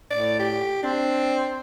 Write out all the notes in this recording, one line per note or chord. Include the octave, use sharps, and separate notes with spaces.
A2 D5
G4
C4 D4